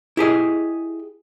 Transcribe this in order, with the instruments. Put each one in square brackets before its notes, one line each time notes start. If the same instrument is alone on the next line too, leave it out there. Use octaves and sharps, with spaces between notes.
[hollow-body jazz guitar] E4 G4 G#4 D#5